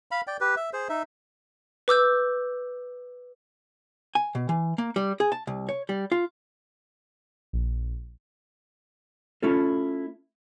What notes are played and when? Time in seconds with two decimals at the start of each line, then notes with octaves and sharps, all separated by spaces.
0.11 F5 B5
0.27 D5 G5
0.41 G4 B4
0.56 E5
0.73 G#4 C5
0.89 D#4 E5
1.88 B4 D6 E6 G6
4.15 G#5
4.35 B2
4.49 E3
4.78 A#3
4.96 G3
5.20 G#4
5.32 A5
5.47 C2
5.69 C#5
5.89 G3
6.12 F4
7.53 A#1
9.43 A3 C#4 E4 F4 A4